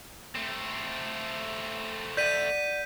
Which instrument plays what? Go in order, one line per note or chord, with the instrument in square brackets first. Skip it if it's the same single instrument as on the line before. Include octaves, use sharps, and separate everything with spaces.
[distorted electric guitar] A3 C4
[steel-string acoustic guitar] D5 F#5 [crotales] G6 B6 D#7